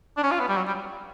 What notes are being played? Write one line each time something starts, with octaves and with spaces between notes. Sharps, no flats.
D4
C#4
F4
B3
G3
F#3
G3